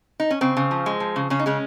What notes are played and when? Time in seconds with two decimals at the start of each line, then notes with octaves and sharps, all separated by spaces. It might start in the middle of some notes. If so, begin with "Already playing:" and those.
0.20 D#4
0.31 C#4
0.41 C#3 C4
0.57 C#3
0.71 F3
0.86 G#3
1.00 F3
1.16 C#3
1.30 C#3 C#4
1.39 D#4
1.46 C#3 G#3 C#4